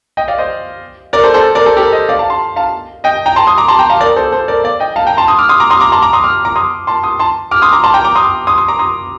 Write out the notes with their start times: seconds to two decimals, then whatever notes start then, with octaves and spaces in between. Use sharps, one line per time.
0.17 D#5 G5
0.28 D5 F5
0.38 C5 D#5
1.13 A#4 D5
1.24 A4 C5
1.34 A4 C5
1.55 A#4 D5
1.66 A4 C5
1.77 G4 A#4
1.93 C5 D#5
2.09 D5 F5
2.19 F5 A5
2.30 A5 C6
2.56 F5 A5
3.04 D#5 G5
3.26 G5 A#5
3.36 A5 C6
3.47 C6 D#6
3.58 A#5 D6
3.68 A5 C6
3.79 G5 A#5
3.90 F5 A5
4.00 A#4 D5
4.16 A4 C5
4.32 A4 C5
4.48 A#4 D5
4.64 D5 F5
4.80 D#5 G5
4.96 F5 A5
5.07 G5 A#5
5.17 A5 C6
5.28 C6 D#6
5.39 D6 F6
5.49 C6 D#6
5.60 A#5 D6
5.70 C6 D#6
5.81 A#5 D6
5.92 A5 C6
6.02 A#5 D6
6.13 C6 D#6
6.23 D6 F6
6.45 A#5 D6
6.56 C6 D#6
6.87 A5 C6
7.03 C6 D#6
7.19 A5 C6
7.51 D6 F6
7.62 C6 D#6
7.73 A#5 D6
7.84 A5 C6
7.94 G5 A#5
8.04 A#5 D6
8.15 C6 D#6
8.47 C6 D#6
8.58 C6 D#6
8.68 A#5 D6
8.79 C6 D#6